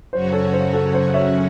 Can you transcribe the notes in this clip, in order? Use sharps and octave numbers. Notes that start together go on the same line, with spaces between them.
F#2 C#3 F#3 C#4 F#4 C5
A4 C#5
C5
A4
C5
C#5 E5